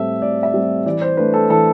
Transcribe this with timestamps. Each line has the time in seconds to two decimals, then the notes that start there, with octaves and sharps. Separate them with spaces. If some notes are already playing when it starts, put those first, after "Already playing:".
Already playing: A2 G3 C4 A4 E5
0.22 A2 D5
0.43 E5
0.53 G3 C4
0.86 E3 D5
1.02 C5
1.17 A3 D4 B4
1.34 A4
1.50 E3 A4